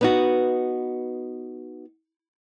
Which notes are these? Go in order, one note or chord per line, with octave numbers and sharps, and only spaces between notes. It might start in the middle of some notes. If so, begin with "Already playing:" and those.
B3 D#4 F#4